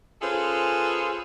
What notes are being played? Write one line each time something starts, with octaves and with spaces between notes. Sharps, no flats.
C#4 F4 G#4 A4 B4 C5